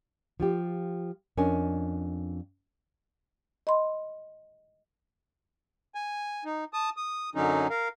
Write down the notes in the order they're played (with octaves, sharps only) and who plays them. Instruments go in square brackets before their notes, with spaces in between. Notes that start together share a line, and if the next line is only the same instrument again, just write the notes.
[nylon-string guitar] F3 F4 G4
F2 C#4 D4 A#4 D#5 G#5
[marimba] D#5 B5 C6
[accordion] G#5
D#4
A5 D#6
D#6
F#2 D3 F#3 C#4 D#4
A#4 F5